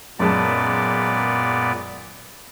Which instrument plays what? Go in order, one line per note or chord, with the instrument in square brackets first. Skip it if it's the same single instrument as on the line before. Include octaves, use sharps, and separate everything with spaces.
[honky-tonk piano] F#2 G#3 A5 [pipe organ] A#2 B3 D5